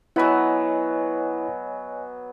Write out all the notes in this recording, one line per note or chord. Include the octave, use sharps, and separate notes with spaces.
F#3 B3 E4 C#5 D#5 G#5 B5